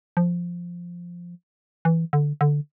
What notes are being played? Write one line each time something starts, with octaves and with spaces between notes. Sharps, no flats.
F3
E3
D3
D3